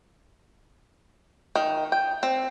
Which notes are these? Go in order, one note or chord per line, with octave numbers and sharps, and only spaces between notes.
D#3
G5
C4